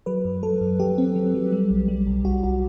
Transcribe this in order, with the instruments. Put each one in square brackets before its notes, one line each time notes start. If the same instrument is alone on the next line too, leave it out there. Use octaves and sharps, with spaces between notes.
[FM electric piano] F#3 B4
F#2
F#3 A4
F#2
F#3 G4
C4
F#3
F#3
G3
B1
G3
B1
B1 F#4
B1 F#4